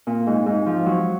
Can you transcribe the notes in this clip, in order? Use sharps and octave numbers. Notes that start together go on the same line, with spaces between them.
A#2
G#2
G#2
F3
F#3